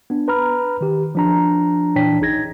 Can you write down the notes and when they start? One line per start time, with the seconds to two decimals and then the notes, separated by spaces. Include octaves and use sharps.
0.10 B3 D4
0.28 B4 A#5 B5 F6
0.81 D#3 G4
1.15 F3 D4 A#5
1.96 A#2 E3 D4 C#5 G5 B6
2.21 A#1 D#4 G#4 G#6 A#6